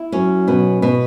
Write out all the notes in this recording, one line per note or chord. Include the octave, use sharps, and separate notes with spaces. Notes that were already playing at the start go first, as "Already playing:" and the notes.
Already playing: E4
F#2 C#4
F#2 B2
B2